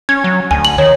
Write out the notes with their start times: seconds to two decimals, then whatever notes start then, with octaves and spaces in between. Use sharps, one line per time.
0.09 C#4 G#6
0.24 F#3
0.51 D2 G#5
0.65 F#7
0.78 D#3 C#5